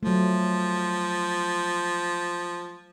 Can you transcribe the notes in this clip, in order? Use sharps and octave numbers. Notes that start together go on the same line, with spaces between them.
F3 F#3 A3